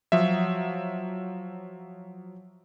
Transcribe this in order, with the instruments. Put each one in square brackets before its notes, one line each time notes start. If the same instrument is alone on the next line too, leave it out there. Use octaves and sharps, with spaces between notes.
[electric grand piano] F3 F#3 E5